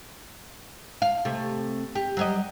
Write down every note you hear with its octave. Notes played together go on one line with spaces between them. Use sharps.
F5
C3 A3
G4
F#3 G3 D#5